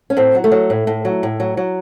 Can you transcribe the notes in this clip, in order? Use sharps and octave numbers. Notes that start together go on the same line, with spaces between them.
C#4
A2 C4
F#3
A3
F#3
A2
A2
F#3
A2
F#3
F#3